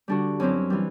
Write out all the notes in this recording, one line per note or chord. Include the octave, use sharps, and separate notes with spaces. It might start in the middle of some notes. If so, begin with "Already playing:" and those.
D3 G3 D4 F#4
F#2 F#3 C4 E4
E3 G3